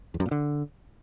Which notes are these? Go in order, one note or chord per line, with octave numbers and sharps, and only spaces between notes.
E2
F#2
A#2
D3